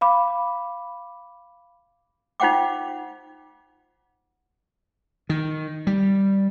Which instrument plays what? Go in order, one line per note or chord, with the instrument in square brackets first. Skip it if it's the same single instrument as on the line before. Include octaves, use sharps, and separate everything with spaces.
[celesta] F5 B5 D6
[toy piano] D#4 F4 C5 F#5 G5 D6
[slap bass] D#3
G3